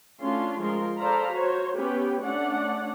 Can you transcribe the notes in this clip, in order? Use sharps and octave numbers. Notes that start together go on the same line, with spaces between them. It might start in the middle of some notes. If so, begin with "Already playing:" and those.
A3 C#4 D4 F4 C6
F3 G#3 F4 A#4 C6
A4 C5 D5 F5 A#5 B5
F#4 C5 C#5
B3 C#4 G4 B4 G5
A3 C#4 D4 D5 F#5